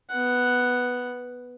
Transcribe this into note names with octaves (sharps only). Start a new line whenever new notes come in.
B3 F#5